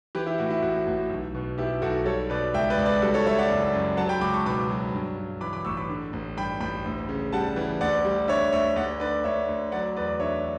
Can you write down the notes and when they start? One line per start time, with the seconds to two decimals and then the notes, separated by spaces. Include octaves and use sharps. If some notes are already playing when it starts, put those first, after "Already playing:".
0.15 E3 G4 B4
0.26 E4 G4
0.38 A2 F#4
0.50 E4
0.62 A1 F#4
0.87 A1 F#4
1.10 B1
1.35 B2
1.58 B2 E4 G4
1.82 B1 F#4 A4
2.06 G3 A4 C#5
2.30 B2 B4 D5
2.54 C#2 E5 G5
2.70 B4 D5
2.78 C#2
2.86 B4 D5
3.02 G3 F#4 A4
3.14 A4 C#5
3.26 G3 C#5 E5
3.38 D5 F#5
3.50 F#1
3.73 F#2
3.97 F#3 F#5 A5
4.09 G5 B5
4.21 C#2 B5 D6
4.33 A5 C#6
4.46 B2 B5 D6
4.69 F#3
4.93 G2
5.18 G2
5.41 E3 B5 D6
5.53 B5 D6
5.65 A1 C#6 E6
5.77 B5 D6
5.89 D3
6.13 A1
6.37 G2 G5 B5
6.60 A1 G5 B5
6.86 D2
7.09 C#3
7.32 G3 F#5 A5
7.56 E3
7.81 D2 D5 F#5
8.05 G3
8.28 D3 C#5 E5
8.52 D2 C#5 E5
8.76 D2 D5 F#5
9.00 D3 B4 D5
9.24 D2 C#5 E5
9.49 D2
9.72 F#3 D5 F#5
9.96 E2 B4 D5
10.20 D3 C#5 E5